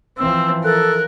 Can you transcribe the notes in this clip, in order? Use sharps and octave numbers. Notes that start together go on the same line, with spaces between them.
E3 F3 C4 E6
A4 A#4 F#6